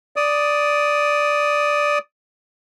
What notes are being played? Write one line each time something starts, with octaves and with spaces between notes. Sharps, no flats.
D5 D#6